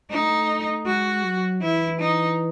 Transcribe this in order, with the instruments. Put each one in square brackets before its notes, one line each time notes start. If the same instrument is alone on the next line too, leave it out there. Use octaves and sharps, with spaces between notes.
[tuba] A3 [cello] D#4
[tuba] G#3 [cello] F#4
[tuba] F#3
[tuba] E3 [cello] E4
[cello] D#4